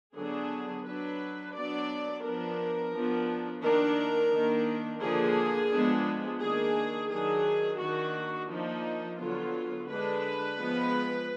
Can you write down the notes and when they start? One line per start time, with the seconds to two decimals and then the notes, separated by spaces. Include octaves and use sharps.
0.16 D3 F#3 B3 D4 G#4
0.85 F#3 D4 B4
1.55 F#3 B3 D4 D5
2.24 F3 B3 D4 A#4
2.94 F3 B3 D4
3.63 D#3 A#3 D4 A#4
4.33 D#3 A#3 D4
5.02 D3 F3 A#3 D4 G#4
5.72 F3 G#3 B3 D4
6.41 D#3 A#3 D4 G#4
7.11 D#3 F#3 D4 G#4
7.80 D#3 A#3 D4 F#4
8.49 F3 A#3 D4 D#4
9.19 D3 F#3 B3 F4
9.88 D3 G#3 D4 B4
10.58 F3 G#3 B3